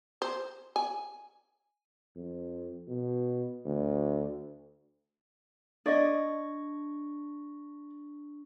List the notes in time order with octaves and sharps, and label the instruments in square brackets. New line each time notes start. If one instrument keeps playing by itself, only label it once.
[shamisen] C5
G#5
[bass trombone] F2
B2
D2
[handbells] D4 C#6 A#6 [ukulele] D5 D#5